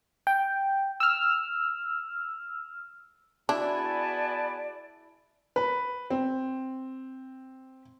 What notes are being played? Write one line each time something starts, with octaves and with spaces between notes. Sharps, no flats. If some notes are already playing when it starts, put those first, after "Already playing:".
G5
E6 F6
B3 D4 E4 F#4 G#4 D5 G#5 A5
B4
C4